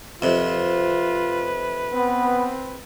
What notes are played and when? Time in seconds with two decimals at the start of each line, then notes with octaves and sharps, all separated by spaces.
0.22 F2 C3 F4 B4
1.93 B3 C4